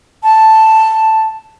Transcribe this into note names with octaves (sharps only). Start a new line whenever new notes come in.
A5